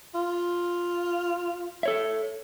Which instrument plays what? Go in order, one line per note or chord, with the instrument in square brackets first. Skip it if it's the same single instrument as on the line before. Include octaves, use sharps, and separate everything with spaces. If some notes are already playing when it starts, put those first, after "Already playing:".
[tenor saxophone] F4
[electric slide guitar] A4 C#5 E5